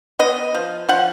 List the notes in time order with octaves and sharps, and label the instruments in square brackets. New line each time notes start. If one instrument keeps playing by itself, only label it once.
[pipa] B3 D#5
F3
F3 F#5